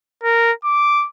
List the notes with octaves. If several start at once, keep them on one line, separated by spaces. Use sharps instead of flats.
A#4
D6